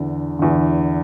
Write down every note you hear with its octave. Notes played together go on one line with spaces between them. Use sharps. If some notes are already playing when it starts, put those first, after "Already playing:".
Already playing: E2 D3
E2 D3